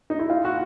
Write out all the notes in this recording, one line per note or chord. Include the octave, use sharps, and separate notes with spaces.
D#4
E4
F4
F#4